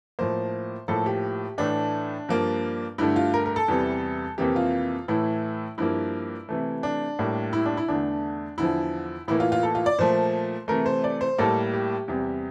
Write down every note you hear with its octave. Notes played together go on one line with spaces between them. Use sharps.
A2 F3 A#3 C5
A2 F3 A#3 A4
G4
A2 E3 A3 D4
G2 F3 A#3
G2 D3 A3 E4
F4
A#4
A#4
A4
E2 C3 E3 G3
F2 C3 E3 A#3 G4
F4
A2 E3 A3 E4
G2 F3 A#3 E4
C3 E3 A3
D4
A2 G3 A#3
E4
D4
E4
E2 D3 A3 D4
E2 D3 F3 E4
A2 E3 A#3 E4
F4
F4
A4
F4
D5
A#2 F3 A3 C5
C3 E3 A3 A#4
C5
D5
C5
A2 G3 A#3 A4
G4
E2 C3 G3